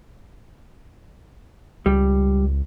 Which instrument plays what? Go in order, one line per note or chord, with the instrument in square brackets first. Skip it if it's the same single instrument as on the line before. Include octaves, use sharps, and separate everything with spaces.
[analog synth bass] C#2 [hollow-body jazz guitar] G3